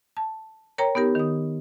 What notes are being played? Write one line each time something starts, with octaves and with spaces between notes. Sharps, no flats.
A5
A#4 C#5 G5 A#5
B3 D#4 G4 A#4
D#3 D#6